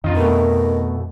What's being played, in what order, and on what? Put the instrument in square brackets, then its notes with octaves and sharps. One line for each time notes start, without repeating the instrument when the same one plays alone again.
[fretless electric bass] F2 D4 [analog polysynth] D#3 [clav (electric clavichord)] F4 D#5
[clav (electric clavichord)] B2 A3 [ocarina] A#4